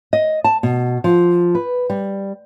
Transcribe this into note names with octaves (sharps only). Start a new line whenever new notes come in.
D#5
A5
B2
F3
B4
G3